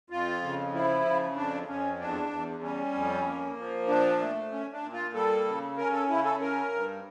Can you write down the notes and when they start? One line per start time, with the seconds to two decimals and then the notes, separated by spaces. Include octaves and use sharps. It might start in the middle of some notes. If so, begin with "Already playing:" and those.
0.10 F2 F4
0.42 C#3
0.74 F3 E4
1.05 C#3
1.36 F2 D4
1.67 F2 C#4
1.99 E2 D4
2.31 E2
2.63 G3 C#4
2.94 F2
3.26 A#3
3.57 F3
3.88 A#2 D4
4.20 A3
4.52 C#4
4.72 D4
4.83 A#2
4.93 F4
5.15 G3 A4
5.46 C#3
5.77 C#4 A#4
5.93 A4
6.09 C#3 E4
6.25 A4
6.40 C#4 A#4
6.72 G2